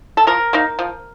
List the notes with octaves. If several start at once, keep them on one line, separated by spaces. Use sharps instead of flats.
A4
F3 A#4
A#3 D#4
F3